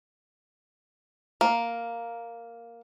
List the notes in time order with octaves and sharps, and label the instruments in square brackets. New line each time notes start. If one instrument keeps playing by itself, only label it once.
[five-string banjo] A#3